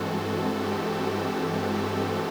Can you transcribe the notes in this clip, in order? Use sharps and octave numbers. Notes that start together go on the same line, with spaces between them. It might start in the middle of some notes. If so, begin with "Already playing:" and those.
Already playing: G2 E3 G#3 C4 F#4 A4
F#4
G4
F#4
F#4